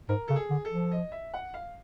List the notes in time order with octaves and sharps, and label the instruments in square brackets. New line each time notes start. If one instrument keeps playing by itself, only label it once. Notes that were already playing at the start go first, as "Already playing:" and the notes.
[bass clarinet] G#2 [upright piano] A#4
[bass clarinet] C#3 [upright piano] A4
[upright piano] G#4
[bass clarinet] D3
[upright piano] A4
[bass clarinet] F3
[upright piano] D#5
E5
F#5
F5